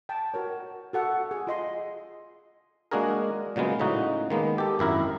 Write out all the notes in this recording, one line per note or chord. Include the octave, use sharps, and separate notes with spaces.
G5 A5
F#4 A#4 C#5
F#4 A4 F#5
G#4
F4 D#5 C6
G#3 A#3 D4 F#4 G#4 A#4
A#2 C#3 F#3 G#3 B3
A2 C#3 D#4 F#4
D#3 G#3 A#3 B3
G4 A4
G#1 F#2 E4 A#4